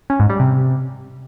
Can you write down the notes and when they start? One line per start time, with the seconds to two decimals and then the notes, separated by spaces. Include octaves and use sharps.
0.10 C#4
0.20 G#2
0.30 G3
0.40 C3